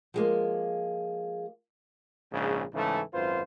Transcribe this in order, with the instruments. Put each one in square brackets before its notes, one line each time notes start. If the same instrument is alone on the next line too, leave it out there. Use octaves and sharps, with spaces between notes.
[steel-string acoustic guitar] F3 G#3 A#3
[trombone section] A#1 G#2 C#3 G#4
G#2 C#3 E3 A3
G#1 F#2 F4 B4 C5